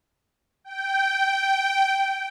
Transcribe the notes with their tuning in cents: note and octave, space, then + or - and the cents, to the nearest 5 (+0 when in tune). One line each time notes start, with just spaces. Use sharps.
G5 -10